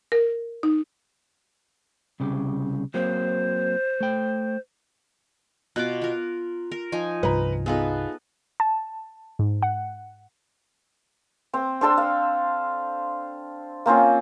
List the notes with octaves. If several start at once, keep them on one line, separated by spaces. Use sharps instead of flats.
A#4
D#4
C2 C#3 G4
F#3 A#3 C4 C5
A3 G5
B2 F4 D6 F#6
F4 A#4
A#4
F3 D#4 G#5
C2 G2 B4 A#5
B3 D#4 F4 G#4 A4 B4
A5
G#2
F#5
C4
C4 D4 A4 C6
F5
A#3 C4 C#4 F4